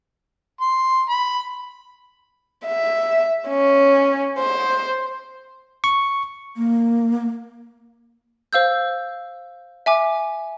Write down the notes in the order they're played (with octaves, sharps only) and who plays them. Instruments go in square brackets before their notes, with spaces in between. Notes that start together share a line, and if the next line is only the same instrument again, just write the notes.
[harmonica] C6
B5
[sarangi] E5
C#4
C5
[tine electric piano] C#6
[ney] A#3
[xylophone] C5 F5 E6 G6
E5 G#5 D6